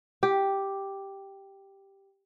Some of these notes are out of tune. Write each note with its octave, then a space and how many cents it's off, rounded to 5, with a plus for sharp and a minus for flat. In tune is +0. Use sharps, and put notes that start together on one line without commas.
G4 +0